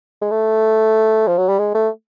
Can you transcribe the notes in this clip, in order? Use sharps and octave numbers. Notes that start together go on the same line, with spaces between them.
G#3
A3
F3
F#3
G3
G#3
A3